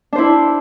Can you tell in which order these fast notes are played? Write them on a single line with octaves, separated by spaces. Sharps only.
D4 C5 E4